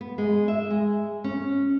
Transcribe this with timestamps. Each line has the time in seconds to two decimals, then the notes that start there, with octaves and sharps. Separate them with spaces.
0.01 B3
0.18 G#3
0.48 E5
0.70 G#3
1.24 C#4